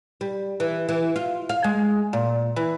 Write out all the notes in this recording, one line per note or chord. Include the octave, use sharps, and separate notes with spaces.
G3
E3
E3
F4
F5
G#3
A#2
E3